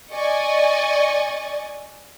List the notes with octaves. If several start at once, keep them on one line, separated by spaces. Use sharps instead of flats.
D5 D#5 G#5 C#6